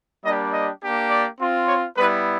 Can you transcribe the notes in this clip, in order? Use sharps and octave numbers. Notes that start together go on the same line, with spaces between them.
G3 A#3 D4 G4 D#5
D#5
A#3 D4 G4
D5
C4 F4
C#5
G3 B3 E4 B4